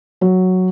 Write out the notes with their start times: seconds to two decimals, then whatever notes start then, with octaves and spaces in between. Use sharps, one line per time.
0.21 F#3